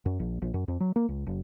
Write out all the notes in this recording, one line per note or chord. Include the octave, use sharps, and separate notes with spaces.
F#2
A#1
A#1
F#2
F2
F#3
A#3
C#2
F#1